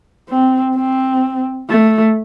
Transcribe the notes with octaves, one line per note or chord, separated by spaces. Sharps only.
C4
C4
A3